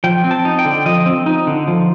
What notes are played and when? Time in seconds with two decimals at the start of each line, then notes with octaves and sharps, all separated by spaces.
0.04 F3 G5
0.24 C4
0.31 A5
0.45 D#4
0.59 G5
0.65 D3
0.86 F3 D#5
1.06 C4
1.26 D#4
1.47 D3
1.68 F3